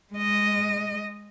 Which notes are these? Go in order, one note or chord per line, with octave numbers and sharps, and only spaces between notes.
G#3 D#5